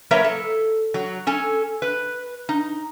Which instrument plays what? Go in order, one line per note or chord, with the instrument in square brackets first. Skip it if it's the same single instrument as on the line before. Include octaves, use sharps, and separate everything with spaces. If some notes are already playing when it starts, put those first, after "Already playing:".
[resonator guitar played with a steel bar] F#3 A#3 A#4 B4 C#5 E5
A4
F#3
C#4 A4 G#5
B4
D#4